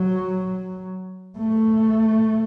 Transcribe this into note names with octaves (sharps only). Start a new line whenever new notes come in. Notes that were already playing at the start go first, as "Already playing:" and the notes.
Already playing: F#3
A3